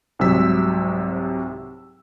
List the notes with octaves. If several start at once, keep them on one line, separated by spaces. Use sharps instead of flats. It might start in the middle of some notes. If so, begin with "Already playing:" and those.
C2 G#2 C3 F#3 E6 B6